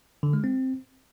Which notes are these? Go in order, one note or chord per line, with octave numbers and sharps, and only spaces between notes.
D3
G#3
C4